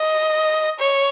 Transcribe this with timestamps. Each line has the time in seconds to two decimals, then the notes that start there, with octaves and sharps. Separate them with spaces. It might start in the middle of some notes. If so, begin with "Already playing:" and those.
Already playing: D#5
0.79 C#5